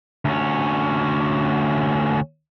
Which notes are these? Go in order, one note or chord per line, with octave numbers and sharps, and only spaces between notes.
D2 C#4